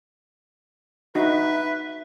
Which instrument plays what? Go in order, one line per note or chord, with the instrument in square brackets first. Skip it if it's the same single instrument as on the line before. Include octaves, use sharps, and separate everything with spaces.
[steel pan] D#4 F#4 [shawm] B4 [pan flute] E5